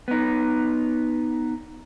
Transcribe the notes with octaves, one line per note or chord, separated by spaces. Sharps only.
B3 D#4